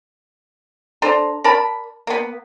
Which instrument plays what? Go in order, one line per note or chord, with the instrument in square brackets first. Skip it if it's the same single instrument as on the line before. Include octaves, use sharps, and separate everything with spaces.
[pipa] D4 A4 C5 A#5
A#4 D5 A5 B5
A#3 B3